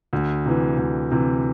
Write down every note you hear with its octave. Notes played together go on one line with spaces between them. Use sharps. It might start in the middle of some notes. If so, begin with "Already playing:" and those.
D2
C3 E3
D2
C3 E3